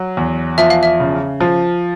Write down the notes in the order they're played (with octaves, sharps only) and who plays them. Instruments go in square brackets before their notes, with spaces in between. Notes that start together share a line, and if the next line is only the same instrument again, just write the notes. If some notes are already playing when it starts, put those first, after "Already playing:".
Already playing: [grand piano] F#3
E2
[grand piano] F3 [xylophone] E5
[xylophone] F5
E5
[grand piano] C#3
F3